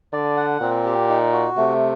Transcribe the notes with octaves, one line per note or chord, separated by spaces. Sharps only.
D3 D5
F#5
A#2 C4
G4
D#4
F#4
C3 A3